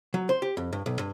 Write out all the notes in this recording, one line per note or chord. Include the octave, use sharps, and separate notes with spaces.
F#3
C5
G4
F2
G2
B1
G2